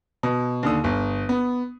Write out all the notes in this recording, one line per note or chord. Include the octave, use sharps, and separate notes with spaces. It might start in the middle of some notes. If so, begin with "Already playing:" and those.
B2
D#2 D3 D#6
G1
B3